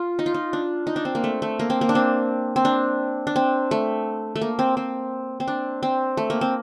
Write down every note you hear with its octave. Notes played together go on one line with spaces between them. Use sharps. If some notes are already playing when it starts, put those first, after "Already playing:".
Already playing: F4
D#4
F4
D#4
D4
D#4
D4
C4
A#3
A3
A3
A#3
C4
A#3
D4
C4
C4
D4
D4
C4
A3
A3
A#3
C4
C4
C4
D4
C4
A3
A#3
C4